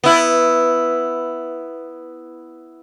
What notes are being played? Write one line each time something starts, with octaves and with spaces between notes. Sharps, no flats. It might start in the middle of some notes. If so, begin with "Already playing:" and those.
B3 E4